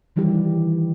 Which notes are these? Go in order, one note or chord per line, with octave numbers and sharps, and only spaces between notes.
D#3 E3 G3 E4 G4